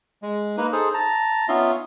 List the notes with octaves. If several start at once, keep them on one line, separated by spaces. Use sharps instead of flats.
G#3
A#3 D#4 B4
D#4 G#4 A4 C5
A5 A#5
B3 C#4 D#4 F4 E5 C6